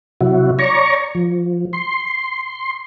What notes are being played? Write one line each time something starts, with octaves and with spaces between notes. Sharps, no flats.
C3 F#3 E4 F#4
C#5 D5 A#5 C#6
F3
C6